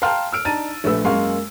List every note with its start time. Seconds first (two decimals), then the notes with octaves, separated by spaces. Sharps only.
0.02 F5 G5 A5 A#5 C6 F6
0.32 E6 F6 D7
0.45 D4 D#4 A5 A#5 A6 D#7
0.84 A#1 A3 B4 E6
1.04 F#2 G#3 A#3 F5 C6 C#6